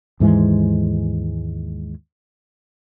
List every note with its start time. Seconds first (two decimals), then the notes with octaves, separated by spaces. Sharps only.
0.20 D#2 G#2 E3 G#3